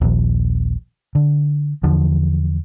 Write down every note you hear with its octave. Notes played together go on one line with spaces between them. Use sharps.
D#1 A#1
D3
E2 D3 F3